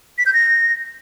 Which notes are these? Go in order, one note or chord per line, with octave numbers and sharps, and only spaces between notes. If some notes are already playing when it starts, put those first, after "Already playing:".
B6
G6
A#6